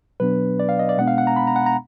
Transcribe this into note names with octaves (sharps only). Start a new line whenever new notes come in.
B2 F#3 B3 D4 B4
D5
F5
D#5
D5
B2 G#3 B3 D4 F#5
F5
F#5
A#5
B5
A#5
F#5
A#5